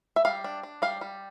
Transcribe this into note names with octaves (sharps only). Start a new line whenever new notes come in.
E5
G3 F5
D4
D4
G3 F5
G3